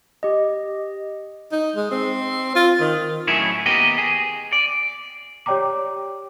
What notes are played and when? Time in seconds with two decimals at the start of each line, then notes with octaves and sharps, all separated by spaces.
0.23 G4 D#5
1.52 D#4
1.76 G#3
1.91 C4
2.55 F4
2.80 D#3
3.27 A2 F#3 C#4 E4 G#4
3.66 D#2 B3 G4 A#4 D#5
3.98 G#4
4.53 D5
5.46 G4 C#5 D5 G5 A#5 D6